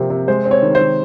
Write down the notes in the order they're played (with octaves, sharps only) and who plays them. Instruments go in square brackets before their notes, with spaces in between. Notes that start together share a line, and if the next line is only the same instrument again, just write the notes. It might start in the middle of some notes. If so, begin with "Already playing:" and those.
Already playing: [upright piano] C3 F3 A#3 C4
C3
G#3 C5
C4
C#5
D#3
C5
D#3